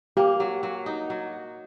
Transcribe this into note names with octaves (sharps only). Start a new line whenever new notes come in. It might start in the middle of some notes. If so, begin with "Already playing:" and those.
A#3 G4
F#3
F#3
D#4
F#3